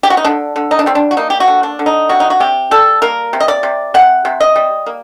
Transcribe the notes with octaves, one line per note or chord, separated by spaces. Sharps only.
G4
F#4
D#4
D3 D4
D3
D#4
D4
G3 C4
D4
F#4
A#3 D#4
G4
F#4
D3
D4
D3
D#4
C3 F#4
D#4
F#4
C3 G4
G3 A4
A#3 A#4
C3
D#5
D5
C3
C3 F#5
C3
D#5
G3
A#3